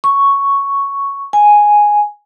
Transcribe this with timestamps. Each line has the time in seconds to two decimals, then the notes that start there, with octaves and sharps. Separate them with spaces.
0.04 C#6
1.33 G#5